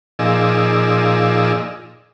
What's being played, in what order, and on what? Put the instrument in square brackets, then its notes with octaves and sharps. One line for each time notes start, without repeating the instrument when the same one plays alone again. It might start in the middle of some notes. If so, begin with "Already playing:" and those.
[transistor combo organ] A#2 F3 D#4 G#4 D5 E6